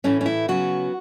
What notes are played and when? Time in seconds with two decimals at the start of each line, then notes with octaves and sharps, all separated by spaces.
0.04 A2 E3 A3 C#4
0.21 C#4
0.26 E4
0.48 C#3 F#3 B3 F#4